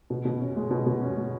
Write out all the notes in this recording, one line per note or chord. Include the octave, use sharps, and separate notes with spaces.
B2
B2
C#4
G#3
B2
B2
C#4
G#3